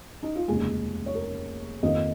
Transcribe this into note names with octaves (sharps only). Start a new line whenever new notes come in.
D#4
F4
F1 D#2 C#3 G#3 G#4
C#5
A#4
F2 D#3 A#3 D#5